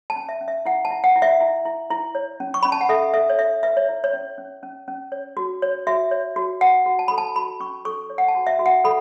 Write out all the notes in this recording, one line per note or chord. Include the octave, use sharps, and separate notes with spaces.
A5
C#4
E5
C#4
E5
E4 F#5
A5
E4
F#5
E4
E5
E4
E4
E4
C#5
C#4
C#6
C#4 B5
A5
F#5
A4 E5
A4 E5
C#5
A4 E5
B4 E5
C#5
E4
C#5
C#4
C#4
C#4
C#4
C#5
F#4
C#5
F#4 E5
C#5
F#4
F#4 F#5
F#4
A5
A4 B5
A5
F#4 B5
C#4 C#6
A4 C#6
C#5
F#5
A5
F#4
E5
F#4
F#5
A4 B5